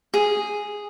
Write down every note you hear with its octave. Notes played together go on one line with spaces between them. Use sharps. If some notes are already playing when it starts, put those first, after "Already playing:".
G#4